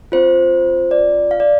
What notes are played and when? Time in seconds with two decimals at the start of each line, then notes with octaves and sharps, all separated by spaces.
0.12 C4 F4 C5
0.91 D5
1.31 F5
1.40 D5